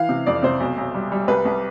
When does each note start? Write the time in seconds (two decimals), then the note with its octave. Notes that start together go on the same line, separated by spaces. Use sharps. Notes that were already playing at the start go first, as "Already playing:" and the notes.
Already playing: E3 F5
0.09 C3
0.26 F2 D5
0.43 C3 C5
0.60 B1
0.78 B1
0.94 G3
1.12 G3
1.28 C2 B4
1.45 C2